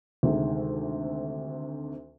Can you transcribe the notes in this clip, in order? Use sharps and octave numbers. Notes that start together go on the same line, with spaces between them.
D2 C3 D#3 G#3 C4